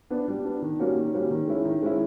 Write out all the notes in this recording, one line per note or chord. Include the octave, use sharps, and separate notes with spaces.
B3 D4
G3
B3 D4
D#3
G3 A#3 C#4 F#4
D#3
G3 A#3 C#4 F#4
D#3
G#3 C#4 E4
D#3
G#3 C#4 E4